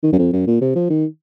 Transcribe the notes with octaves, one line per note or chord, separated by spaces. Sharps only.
D#3
F#2
F2
F#2
A#2
C3
F3
D#3